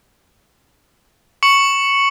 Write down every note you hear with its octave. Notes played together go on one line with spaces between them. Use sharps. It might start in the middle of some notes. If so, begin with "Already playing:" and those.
C#6 C#7 F#7